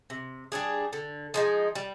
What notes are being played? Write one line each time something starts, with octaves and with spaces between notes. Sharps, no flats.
C3
G3 D4 G#4
D3
F3 G#3 D#4
G3